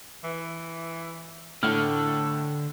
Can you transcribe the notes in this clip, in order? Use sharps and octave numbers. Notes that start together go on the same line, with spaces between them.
E3
A2 D3 A4 F6